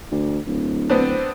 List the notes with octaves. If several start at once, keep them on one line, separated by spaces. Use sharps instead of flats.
D2
D1
B3 C4 D4